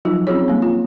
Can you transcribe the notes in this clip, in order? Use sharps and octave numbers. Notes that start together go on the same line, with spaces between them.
F3 F#3 D#4 F4 F#4
C4 C#4 F4 F#4 G#4 C#5
G3 A#3
F4